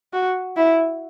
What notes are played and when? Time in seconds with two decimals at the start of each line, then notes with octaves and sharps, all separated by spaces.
0.13 F#4
0.56 E4